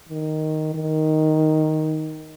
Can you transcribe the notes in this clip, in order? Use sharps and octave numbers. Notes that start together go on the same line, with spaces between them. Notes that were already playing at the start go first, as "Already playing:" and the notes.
D#3
D#3